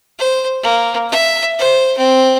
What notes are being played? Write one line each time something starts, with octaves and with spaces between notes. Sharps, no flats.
C5
A#3
E5
C5
C4